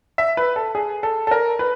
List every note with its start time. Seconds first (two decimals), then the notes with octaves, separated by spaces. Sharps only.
0.18 E5
0.37 B4
0.56 A4
0.75 G#4
1.03 A4
1.27 A4
1.31 A#4
1.59 B4